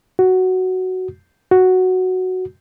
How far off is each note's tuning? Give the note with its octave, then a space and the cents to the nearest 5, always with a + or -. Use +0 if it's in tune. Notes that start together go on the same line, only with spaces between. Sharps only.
F#4 +5
F#4 +0